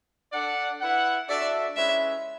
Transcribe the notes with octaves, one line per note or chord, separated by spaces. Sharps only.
D4 A4 D5 F#5
E4 B4 F#5
D4 F#4 A4 D5 E5
G#3 C#4 E4 B4 E5